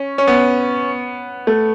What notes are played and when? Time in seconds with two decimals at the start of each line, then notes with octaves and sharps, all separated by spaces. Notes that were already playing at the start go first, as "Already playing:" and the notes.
Already playing: C#4
0.18 C#4
0.27 B3
1.47 A3